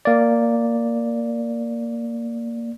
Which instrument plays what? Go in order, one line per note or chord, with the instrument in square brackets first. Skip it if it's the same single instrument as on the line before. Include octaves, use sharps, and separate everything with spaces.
[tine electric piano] A#3 D5